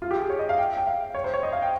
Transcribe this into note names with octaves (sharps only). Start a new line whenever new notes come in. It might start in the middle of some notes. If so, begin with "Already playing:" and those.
F4
G4
G#4
C#5
D#5
F5
G5
G5
F5
C#5
C5
C#5
D#5
F5
G5